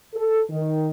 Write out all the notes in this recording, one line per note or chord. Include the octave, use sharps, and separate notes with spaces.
A4
D#3